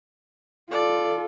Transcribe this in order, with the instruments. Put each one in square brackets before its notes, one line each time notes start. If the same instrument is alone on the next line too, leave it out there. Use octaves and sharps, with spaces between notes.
[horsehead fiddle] F4 A4 [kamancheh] D5